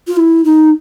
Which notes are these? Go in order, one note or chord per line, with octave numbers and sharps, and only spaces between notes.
F4
E4
D#4